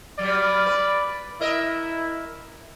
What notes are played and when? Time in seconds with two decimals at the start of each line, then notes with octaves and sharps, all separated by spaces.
0.19 F#3 G3 D5
0.66 B4
1.41 E4 A#4 D#5 E5